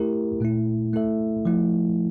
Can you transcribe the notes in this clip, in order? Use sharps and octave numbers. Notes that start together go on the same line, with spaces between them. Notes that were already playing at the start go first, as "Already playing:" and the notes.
Already playing: A3 E4 G4 A#4
A#2 A3 E4
A3 E4 A4 E5
F3 A3 E4